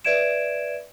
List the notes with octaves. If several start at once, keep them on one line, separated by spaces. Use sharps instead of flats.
B4 D5 E5 G#6 D7 E7